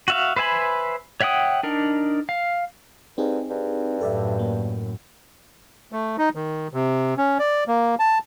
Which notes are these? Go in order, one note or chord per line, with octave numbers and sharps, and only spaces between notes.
F#4 E5 F5
B4 C5 E5 G#5 B5
C#5 E5 F#5 G5 D#6
D4 D#4 A#4
F5
G2 C4 D#4 G#4
G2
F#2 A2 A4 D5 E5
A#3
A3
D#4
D#3
C3
C#4
D5
A#3
A5